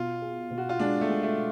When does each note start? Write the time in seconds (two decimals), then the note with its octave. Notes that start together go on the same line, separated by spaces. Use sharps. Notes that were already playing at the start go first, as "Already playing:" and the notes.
Already playing: B2 F4
0.22 G#4
0.51 B2
0.58 F#4
0.69 F4
0.79 G#3 D4
1.01 A3
1.09 G#3
1.23 A3